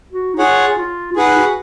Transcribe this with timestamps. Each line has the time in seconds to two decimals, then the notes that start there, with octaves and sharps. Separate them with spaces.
0.13 F#4
0.34 D#4
0.39 F4 G#4 C#5 F#5
0.78 F4
1.12 F4
1.16 D#4 G#4 B4 F#5
1.37 F#4